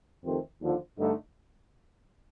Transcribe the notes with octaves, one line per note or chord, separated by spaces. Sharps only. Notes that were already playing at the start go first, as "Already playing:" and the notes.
F2 C3 D#3 A3 C4
D#2 D3 F3
G2 D3 A3 D#4